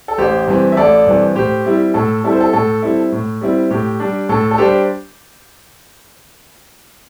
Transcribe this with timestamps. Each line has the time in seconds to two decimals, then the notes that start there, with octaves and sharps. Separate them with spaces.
0.08 A4
0.18 A1 G4 C5
0.48 G2 E3 C4
0.72 E5
0.77 A1 A4 D5
1.06 G2 E3 C4
1.35 A2 G4 C5
1.65 G3 C4 E4
1.94 A2 A4
2.23 G3 C4 E4 A4
2.33 C5
2.41 A4
2.53 A2 A4
2.83 G3 C4 E4
3.12 A2
3.41 G3 C4 E4
3.71 A2 G4
4.00 G3 D4
4.29 A2 A4
4.51 A4
4.58 G3 D4 G4 C5